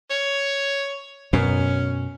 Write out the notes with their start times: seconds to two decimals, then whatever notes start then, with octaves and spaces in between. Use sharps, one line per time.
0.10 C#5
1.33 F#2 B2 C#4